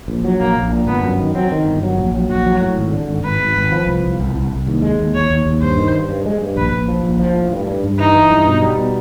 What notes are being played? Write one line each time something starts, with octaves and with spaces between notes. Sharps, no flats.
A#1
F#3
A#1 A#3
A#1
A#2
G1 B3
F#2
D#3
F#3 C4
D#3
G1
F#3
A#1
F#3
A#1 F#4
F#3
A2
G#1
D3
G#1
G#1 B4
G#1
G#1
F3
C2
C2
C2
C2
C2
D#2
G#3
D#2
D#2 C#5
D#2
D#2
G2 C5
D#3
G2
G2
G#3
G2
A#1 B4
A#1
F3
A#1
F3
A2
G2
G2
G2
E3 D#4
E3
G2
B2
G3
B2